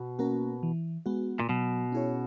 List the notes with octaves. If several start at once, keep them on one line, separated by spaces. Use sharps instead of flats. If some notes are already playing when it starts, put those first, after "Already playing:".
Already playing: B2
A#3 C#4 F#4 A#4
E3
G#3 B3 F#4
A#2
B2 F#3
C#4 E4 G#4 C#5